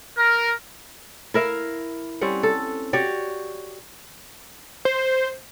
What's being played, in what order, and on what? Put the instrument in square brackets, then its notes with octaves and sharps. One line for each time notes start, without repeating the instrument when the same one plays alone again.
[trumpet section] A#4
[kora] E4 A#4 E5 F5
G3 C4 C#4 F#5
A4
F#4 G4 C#5 D5
[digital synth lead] C5